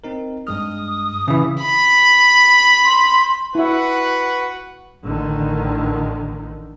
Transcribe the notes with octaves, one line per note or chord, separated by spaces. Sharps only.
C4 D#4 A#4
G2 G#3 D#6 F6
C#3 E3
B5
C6
E4 F#4 B4 E5 F#5
A1 D3 D#3